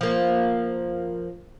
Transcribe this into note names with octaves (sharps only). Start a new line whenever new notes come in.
F3 A#3